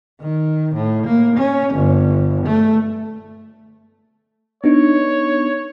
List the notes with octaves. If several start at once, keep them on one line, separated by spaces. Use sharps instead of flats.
D#3
A2
A#3
C#4
G1
A3
B3 D4 D#4 C#5